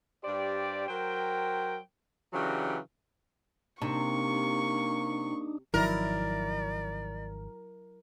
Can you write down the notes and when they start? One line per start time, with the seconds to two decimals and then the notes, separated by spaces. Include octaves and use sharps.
0.24 G2 G4 C5 D5
0.88 F#3 A#4 C5 G5
2.33 C#3 E3 F#3 D4 F#4 G4
3.82 C3 A#3 D4 D#4 C#6
5.74 G#1 D#3 F3 F#3 E4 A#4 D5